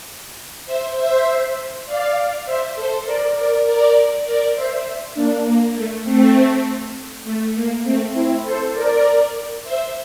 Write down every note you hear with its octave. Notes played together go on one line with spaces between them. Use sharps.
C5 E5
C5 E5
D5 F5
C5 E5
A4 C5
A#4 D5
A#4 D5
A#4 D5
A#4 D5
C5 E5
A#3 D4
A#3
A3
A3 C4
A3
A#3
A3 C4
C4 E4
A4 C5
A#4 D5
C5 E5